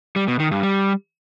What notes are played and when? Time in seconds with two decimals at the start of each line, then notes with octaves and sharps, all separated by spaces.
0.16 G3
0.28 B2
0.40 D#3
0.51 G2
0.63 G3